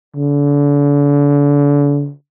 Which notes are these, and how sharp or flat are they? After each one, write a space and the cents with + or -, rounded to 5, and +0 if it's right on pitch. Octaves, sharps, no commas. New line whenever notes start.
D3 -35